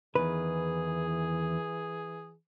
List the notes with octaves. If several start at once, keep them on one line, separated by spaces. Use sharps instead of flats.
E2 D#3 E3 G#4 B4